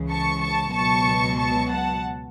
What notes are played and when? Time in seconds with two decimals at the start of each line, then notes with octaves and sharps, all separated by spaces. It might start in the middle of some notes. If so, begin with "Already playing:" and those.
Already playing: C#2 C#3 E3
0.09 A5 C#6
0.41 A5 C#6
0.73 C#2 B2 F#3 A5 C#6
1.37 A5 C#6
1.69 F#5 A5